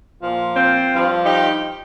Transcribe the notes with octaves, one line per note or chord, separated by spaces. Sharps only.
A#2 F3
C4 F4
G2 F3
D#4 G4